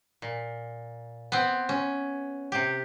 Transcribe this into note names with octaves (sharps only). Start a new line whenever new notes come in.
A#2
B3 C4
C#4
C3 G4